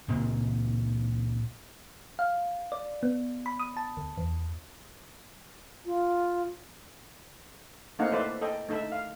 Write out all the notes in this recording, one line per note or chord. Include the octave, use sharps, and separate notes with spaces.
C#2 A#2 C4
F5
D5
B3
B5
D#6
A5
D2
E2
F4
A3 A#3 C4 D#4 F5 F#5
E4 A4 B4 C5 D5 E5
A4 D#5 G5
A3 D#4 A4 E5
F5